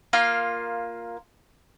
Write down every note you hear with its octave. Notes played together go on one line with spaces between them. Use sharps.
A#3 F4 F5